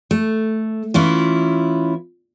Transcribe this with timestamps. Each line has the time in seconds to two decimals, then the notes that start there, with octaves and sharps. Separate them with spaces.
0.11 A3
0.94 E3 C#4 E4 F4